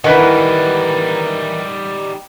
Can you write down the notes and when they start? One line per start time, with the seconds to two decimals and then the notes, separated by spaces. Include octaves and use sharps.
0.04 D#3 E3 G3 D#4 E4 B4 F#5